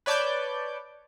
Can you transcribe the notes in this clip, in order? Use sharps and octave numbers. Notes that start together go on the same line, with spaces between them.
B4 C#5 D5 A5 D6 G6